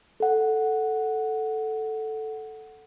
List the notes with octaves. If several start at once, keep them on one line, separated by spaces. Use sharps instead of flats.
A4 F#5